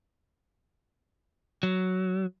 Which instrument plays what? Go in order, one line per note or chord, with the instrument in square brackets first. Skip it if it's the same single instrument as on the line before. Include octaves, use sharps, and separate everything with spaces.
[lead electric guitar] F#3